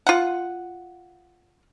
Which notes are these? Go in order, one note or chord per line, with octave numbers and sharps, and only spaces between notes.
F4 F#5